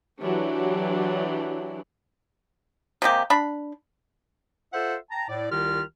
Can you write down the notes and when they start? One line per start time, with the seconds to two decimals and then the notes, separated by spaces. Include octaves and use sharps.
0.20 E3 F#3 D4 G4
3.02 C3 G#3 A#3 G4
3.30 D4 B5
4.72 F4 A4 C5 E5 F#5
5.10 G5 A5 A#5
5.28 A2 D5
5.51 C2 D#3 F4 G4 F6